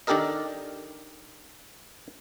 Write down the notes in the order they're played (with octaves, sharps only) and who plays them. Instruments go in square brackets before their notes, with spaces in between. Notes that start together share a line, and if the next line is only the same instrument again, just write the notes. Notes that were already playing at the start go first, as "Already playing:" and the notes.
[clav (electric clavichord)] D#3 D4 G4 A4 A#4 D#5